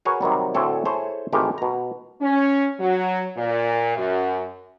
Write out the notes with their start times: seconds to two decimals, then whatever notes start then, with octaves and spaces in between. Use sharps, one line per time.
0.05 F#4 G#4 A#4 B4 C#5
0.21 C3 D#3 F#3 G3
0.54 D2 A2 D3 C4 A4 C#5
0.85 E4 G#4 A4 C5 C#5
1.33 G#1 E3 G#3 A3 G4 A#4
1.58 B2 A#5
2.21 C#4
2.80 F#3
3.37 A#2
3.97 F#2